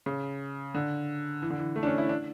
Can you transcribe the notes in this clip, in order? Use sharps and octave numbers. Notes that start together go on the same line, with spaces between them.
C#3
D3
E3
D3
E3
A3
D4
C#4
E4
D4